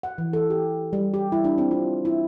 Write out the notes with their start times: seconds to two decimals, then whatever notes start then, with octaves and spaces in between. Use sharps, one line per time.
0.03 F#5
0.18 E3
0.33 A4
0.50 G4
0.93 G3
1.14 G4
1.32 E4
1.44 D4
1.58 C4
1.71 F4
2.05 E4